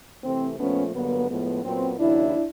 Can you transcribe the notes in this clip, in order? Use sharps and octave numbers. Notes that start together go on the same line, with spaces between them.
C3 E3 A3 C4
A#2 F3 A3 B3 C#4
G2 D3 F#3 A#3 B3
A2 F3 G#3 B3
A#2 F#3 B3 C4
D#2 C#3 F#3 D4 E4